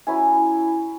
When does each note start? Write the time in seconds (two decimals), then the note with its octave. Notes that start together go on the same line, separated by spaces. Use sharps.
0.07 F#3 C#4 E4 G#5